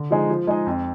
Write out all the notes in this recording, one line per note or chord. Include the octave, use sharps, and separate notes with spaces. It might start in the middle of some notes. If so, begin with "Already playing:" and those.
Already playing: D3
F3 G#3 D#4 G#4
F3
G#3 D#4 G#4 D#5
F2